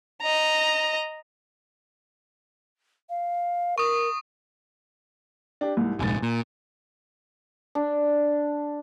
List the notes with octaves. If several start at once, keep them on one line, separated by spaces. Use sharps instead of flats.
D#5 A#5
F5
A#4 C#6 D#6
D4 G4
C2 G#2
F1 A#1 G#2 G#5 A6
A#2
D4